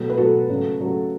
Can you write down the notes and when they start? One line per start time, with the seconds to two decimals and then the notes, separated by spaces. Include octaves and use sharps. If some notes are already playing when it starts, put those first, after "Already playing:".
Already playing: B2 F#3 A3
0.10 B4
0.17 B2 F#3 A3 F#4 A4
0.49 C#3 F#3 A3
0.80 C#3 F#3 A3